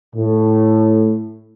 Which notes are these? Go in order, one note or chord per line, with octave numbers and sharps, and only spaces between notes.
A2